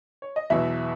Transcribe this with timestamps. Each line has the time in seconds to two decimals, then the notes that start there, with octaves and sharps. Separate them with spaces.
0.22 C#5
0.36 D#5
0.50 E2 B2 F#3 E4 E5